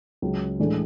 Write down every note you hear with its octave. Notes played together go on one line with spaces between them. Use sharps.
C#2 C#3 F#3
A2 E3 G#3 D4 A4